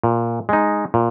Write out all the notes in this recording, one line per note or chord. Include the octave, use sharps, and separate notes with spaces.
A#2
G#3 D#4
A#2